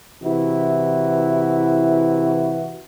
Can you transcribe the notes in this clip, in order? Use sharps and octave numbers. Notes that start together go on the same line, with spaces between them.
C3 E3 E4 F#4